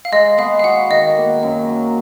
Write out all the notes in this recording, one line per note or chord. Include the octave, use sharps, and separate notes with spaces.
F5
G#3 D#5
B3 F5
F5
F#4 F#5
D#3 D#5
A#3
F#2
F#3